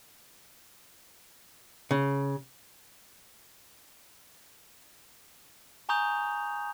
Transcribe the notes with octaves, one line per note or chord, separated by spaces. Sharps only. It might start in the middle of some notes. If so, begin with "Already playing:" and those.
C#3
G#5 A#5 C#6 D#6 G6 F7